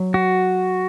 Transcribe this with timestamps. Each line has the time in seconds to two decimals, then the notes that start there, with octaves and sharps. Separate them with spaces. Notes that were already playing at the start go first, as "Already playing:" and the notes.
Already playing: F#3
0.14 F#4